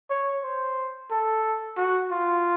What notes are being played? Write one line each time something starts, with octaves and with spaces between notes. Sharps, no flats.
C#5
C5
A4
F#4
F4